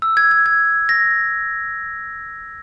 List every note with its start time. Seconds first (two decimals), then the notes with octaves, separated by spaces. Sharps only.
0.02 E6
0.17 G#6
0.31 G#6
0.46 G#6
0.89 A#6